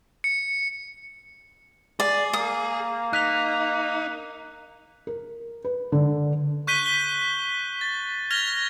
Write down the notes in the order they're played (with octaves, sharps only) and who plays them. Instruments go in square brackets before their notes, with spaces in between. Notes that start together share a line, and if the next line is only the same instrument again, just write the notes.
[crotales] C#7
[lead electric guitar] G#4 [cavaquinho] D5
[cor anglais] A#3 [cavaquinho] D#6
[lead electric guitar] D#4 [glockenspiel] F#6 B6 F7
[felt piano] A#4
B4
D3
[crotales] C#6 F#6 G6 B6 D#7 G7
G7
A6
F6 G#6 A#6 F7 G7